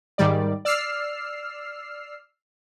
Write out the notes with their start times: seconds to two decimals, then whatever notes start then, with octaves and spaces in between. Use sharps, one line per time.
0.18 G#2 D#3 G3 D5
0.65 D5 E6 F6 C7